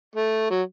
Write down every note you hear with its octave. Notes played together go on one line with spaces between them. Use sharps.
A3
F#3